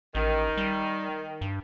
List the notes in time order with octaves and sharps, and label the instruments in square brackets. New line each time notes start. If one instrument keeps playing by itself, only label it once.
[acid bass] A1 [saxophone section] D#3
[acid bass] G3
G2